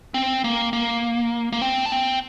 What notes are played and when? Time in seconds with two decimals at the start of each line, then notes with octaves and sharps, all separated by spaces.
0.14 C4
0.44 A#3
0.73 A#3
1.52 A#3
1.62 C4
1.86 D4
1.92 C4